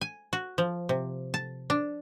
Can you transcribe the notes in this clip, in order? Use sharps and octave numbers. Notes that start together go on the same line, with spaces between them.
G#5
F#4
F3
C3
A5
D4